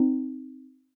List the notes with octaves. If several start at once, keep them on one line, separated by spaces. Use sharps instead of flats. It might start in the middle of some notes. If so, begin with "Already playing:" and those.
Already playing: C4 D#4